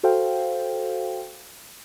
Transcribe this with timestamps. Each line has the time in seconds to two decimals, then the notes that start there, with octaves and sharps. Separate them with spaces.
0.03 F#4 A4 C5 F5 G5